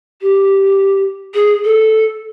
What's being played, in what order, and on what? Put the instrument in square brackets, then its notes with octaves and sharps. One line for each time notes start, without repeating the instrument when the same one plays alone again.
[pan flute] G4
G#4
A4